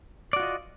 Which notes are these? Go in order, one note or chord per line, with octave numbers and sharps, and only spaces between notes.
F4 F#4 D5 D#5